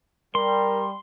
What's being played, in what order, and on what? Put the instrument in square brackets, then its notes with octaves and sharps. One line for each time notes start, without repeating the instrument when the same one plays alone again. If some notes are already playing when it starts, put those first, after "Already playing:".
[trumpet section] G3 [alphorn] A#4 [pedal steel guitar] C6